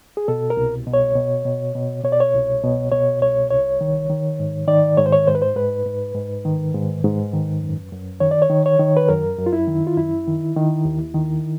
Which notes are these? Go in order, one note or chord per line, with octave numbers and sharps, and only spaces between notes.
G#4
B2 A4
A#4
C2
B2
C#5
B2
B2
B2
B2 C#5
D5
C#5
C2
B2
B2 C#5
C2 C#5
C2 C#5
D#3
D#3
G#2
D#3 D5
G#2 C#5
C5
C#5
G#2 C5
B4
C5
G#2 B4
G#2
G#2
D#3
G#2
G#2
D#3
F#2
F#2
D#3 C#5
D5
C#5
D#3
C#5
D#3
B4
F#2 A#4
F#2
F4
E4
D#3
F4
F#2 E4
D#3
D#3
D#2
D#3